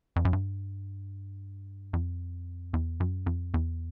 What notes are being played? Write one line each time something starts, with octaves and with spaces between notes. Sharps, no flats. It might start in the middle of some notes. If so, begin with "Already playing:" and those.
F2
F#2
G2
F2
E2
F#2
F2
E2